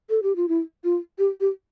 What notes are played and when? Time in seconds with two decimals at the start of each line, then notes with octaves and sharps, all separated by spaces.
0.10 A4
0.23 G4
0.36 F4
0.49 E4
0.84 F4
1.19 G4
1.41 G4